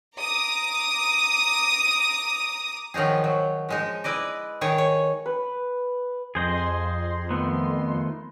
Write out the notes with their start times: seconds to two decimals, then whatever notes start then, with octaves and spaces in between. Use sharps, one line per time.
0.16 A#5 D6 D#6
2.94 D#3 F3 F#3 D#4 G#4
3.24 F#3
3.69 F3 G#3 D#4
4.04 E4 B4 D5 D#5
4.61 D#3 G#4 C#5
4.78 C#5
5.26 B4
6.35 F2 G#4 C5 D#5 C6
7.31 D#3 A3 B3